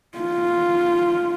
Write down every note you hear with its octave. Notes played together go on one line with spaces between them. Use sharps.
F4